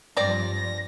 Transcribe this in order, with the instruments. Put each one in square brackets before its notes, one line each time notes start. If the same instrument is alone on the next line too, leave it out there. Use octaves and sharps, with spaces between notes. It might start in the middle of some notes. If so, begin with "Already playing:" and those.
[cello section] G2 F3 [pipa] C4 D5 [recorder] A#6